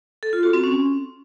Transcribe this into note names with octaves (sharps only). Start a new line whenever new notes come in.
A4
F4
F#4
C4
C#4